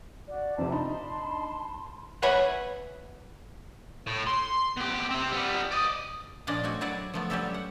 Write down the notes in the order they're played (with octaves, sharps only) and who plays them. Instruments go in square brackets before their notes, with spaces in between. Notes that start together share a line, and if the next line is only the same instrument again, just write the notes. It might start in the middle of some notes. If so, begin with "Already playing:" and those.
[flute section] F#4 D5
[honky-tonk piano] F2 C3 [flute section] C5 A5
[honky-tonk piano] D4 D#4 [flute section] A5 B5 C6
[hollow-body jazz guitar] B4 C#5 E5 F#5 G#5 B5
[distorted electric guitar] A2
C6
B2 G4
C4 G4
G3 B3
D5 D#5
[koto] A#2 F3 C#4 D4 D5 D#5
A3 C4 F#4 G#5
F#3 D4 E4 D5 F#5 G#5
F3 A3 B3
F#3 G3 C#4 G4 A4 E5
F#5